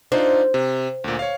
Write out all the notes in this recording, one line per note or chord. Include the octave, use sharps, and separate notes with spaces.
D4 D#4 F4 C5
C3
D2 A#2
C#5 F5